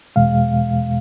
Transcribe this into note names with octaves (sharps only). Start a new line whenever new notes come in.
E2 B2 G#3 F5